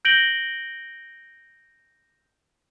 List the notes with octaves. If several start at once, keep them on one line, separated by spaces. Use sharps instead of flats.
G6 A#6 D7 F#7 G7